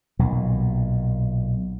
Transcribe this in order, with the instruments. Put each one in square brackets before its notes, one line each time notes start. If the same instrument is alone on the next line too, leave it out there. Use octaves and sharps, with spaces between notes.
[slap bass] B1 A#2